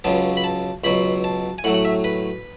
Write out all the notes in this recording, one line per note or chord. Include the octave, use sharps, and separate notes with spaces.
C#2 C#3 F#3 B3 A5
B5
A5
C#2 B2 F#3 B5
A5
G#5
A2 F#3 A3 F#5
F#5
E5
B4